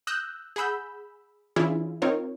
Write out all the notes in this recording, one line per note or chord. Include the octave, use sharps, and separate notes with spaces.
D#6 E6 F#6 G6 A#6
G#4 F#5 B5 E6 G6
E3 C#4 D4 E4 F4 G#4
C4 D#4 F4 A#4 C#5